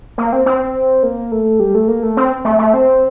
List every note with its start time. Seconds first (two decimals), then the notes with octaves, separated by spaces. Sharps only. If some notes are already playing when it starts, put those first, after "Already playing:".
0.18 A#3
0.33 C4
0.46 C4
1.03 A#3
1.32 A3
1.60 G3
1.75 A3
1.88 A#3
2.03 A3
2.17 C4
2.45 A3
2.59 A3
2.74 C4